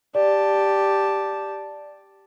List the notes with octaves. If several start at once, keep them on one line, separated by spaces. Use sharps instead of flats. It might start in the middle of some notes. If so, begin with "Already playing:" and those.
G4 D5 A5